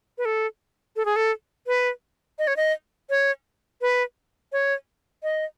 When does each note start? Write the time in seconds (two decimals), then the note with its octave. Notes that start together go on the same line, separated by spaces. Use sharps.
0.18 B4
0.25 A4
0.96 A4
1.05 G#4
1.16 A4
1.67 B4
2.39 D#5
2.47 C#5
2.56 D#5
3.10 C#5
3.81 B4
4.52 C#5
5.23 D#5